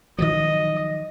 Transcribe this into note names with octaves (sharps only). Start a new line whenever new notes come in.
D#3 F3 F#3 D#5